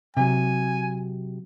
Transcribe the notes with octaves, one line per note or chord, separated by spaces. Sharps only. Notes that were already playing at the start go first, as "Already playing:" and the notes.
C3 F#3 G#5